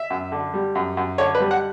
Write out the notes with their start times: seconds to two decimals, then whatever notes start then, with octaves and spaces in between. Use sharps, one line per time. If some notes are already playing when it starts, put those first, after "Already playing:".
Already playing: E5
0.10 F#2
0.32 D3
0.54 G3
0.75 F#2
0.97 F#2
1.18 D3 C#5
1.35 B4
1.40 G3
1.51 F#5